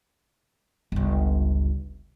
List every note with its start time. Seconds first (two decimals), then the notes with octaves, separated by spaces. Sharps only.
0.92 G1 C#2